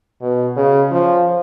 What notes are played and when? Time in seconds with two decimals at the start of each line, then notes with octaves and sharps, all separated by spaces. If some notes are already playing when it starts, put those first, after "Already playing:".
0.22 B2
0.56 C#3
0.91 F3